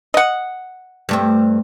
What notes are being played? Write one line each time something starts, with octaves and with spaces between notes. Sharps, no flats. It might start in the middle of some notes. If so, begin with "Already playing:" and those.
D#5 F#5
G2 A3 C4